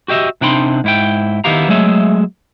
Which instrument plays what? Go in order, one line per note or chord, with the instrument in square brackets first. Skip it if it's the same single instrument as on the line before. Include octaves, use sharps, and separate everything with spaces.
[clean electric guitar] F#4 G4 D#5 E5
C3 D4 D#4 G5 B5 C6
G#2 E4 G5
D#3 B3 E4 G4 F5 A#5
F#3 G#3 A3 G#4 E5